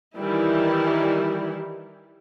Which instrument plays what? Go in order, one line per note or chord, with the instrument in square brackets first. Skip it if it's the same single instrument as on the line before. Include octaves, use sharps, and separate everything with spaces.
[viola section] D#3 E3 G3 E4